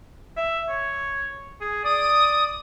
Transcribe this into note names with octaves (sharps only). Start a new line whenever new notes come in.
E5
C#5
G#4
D5 D#6